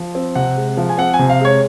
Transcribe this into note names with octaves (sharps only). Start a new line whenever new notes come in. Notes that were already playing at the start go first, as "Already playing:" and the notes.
Already playing: F3
C4
C3 F#5
G#3
F3
G#5
C4 F#5
G#5
C3
F5
G#3 C#5